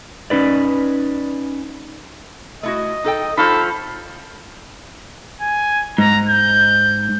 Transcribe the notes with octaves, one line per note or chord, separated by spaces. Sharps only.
C#4 D#4 B4 D5
A3 E4 F#4 D#5
D#4 A4 G5
F3 D#4 A4 F5 B5
G#5
G#2 A#5
G6